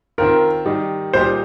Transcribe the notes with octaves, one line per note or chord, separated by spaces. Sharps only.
D#3 C4 F4 A#4
D#3 G3 D#4
A#2 G3 D#4 G4 C5